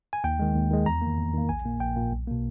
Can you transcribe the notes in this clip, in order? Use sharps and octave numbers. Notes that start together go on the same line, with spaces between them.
G#5
D#2 G5
D#3 G#3
D#2
D#3 G#3
E2 A#5
D#3 A#3
E2
D#3 A#3
A#1 G#5
A#2 A#3
A#1 G5
A#2 A#3
B1
B2 A#3